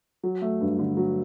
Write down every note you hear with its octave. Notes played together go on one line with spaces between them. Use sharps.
F#3
A3
G2
D3
F#3